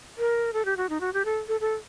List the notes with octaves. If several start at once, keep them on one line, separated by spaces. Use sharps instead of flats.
A#4
A4
G4
F#4
D#4
F#4
G4
A4
A4
A4